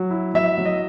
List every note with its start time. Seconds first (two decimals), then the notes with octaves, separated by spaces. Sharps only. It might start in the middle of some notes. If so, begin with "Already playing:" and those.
Already playing: F#3
0.10 E4
0.34 F#3 E5
0.58 F#3
0.65 D#5